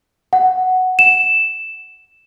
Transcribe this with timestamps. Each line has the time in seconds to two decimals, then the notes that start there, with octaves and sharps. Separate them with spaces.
0.33 F#5
0.99 E7